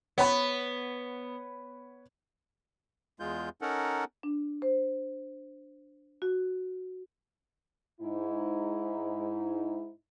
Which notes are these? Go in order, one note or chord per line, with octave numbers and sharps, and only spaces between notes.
B3 C#5 B5
E2 G#3 F4 G6
C#4 D#4 A4 A#4 F#5
D4
C5
F#4
G#2 D#4 E4